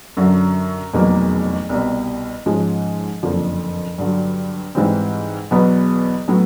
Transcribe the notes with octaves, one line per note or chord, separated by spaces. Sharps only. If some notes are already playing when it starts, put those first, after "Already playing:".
F#2 D3 F#3
F1 E2 B2 F#3 A#3
C2 B2 G3
G#2 F3 G#3 C#4
F#1 F2 D3 F3
G2 D3 F#3
G#2 E3 G3 C4
E2 B2 F#3 B3
A2 F#3 B3